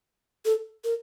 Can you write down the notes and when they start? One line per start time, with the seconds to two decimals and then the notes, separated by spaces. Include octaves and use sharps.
0.45 A4
0.84 A#4